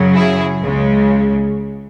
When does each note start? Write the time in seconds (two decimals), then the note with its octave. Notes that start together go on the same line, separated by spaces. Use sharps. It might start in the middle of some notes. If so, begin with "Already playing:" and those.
Already playing: F#2 C#3 F#3
0.15 E4 G#4
0.60 C#2 C#3 G#3